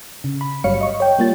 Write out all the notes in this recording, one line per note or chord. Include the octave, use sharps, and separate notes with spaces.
C#3
B5
G1 F#3 G3 C#5 F5 C#7
D#5 C#6
C#5 G5
G3 A#3 F4 A6